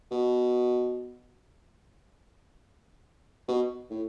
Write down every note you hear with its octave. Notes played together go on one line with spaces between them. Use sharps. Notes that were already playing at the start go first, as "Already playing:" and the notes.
B2
B2
A2